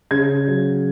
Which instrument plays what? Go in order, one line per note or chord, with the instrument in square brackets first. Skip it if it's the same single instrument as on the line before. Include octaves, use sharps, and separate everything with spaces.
[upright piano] C#3 G#6
F#3